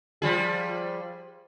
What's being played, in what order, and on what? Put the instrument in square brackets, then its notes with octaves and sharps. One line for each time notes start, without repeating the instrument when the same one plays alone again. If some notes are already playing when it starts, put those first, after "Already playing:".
[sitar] F3 G3 G#4